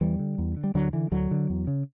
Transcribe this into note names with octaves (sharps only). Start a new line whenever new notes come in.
E2 E3 G3
D3
E2
D3
G3
D2 D3 F#3
D3 E3
D2 D3 F#3
D3
E2
C#3